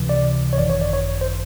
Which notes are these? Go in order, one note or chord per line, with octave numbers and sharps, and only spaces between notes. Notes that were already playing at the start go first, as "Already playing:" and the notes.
Already playing: C#2 C3 E3
D5
C#5
G#1 F#2 D#3 D5
C#5
D5
C#5
C5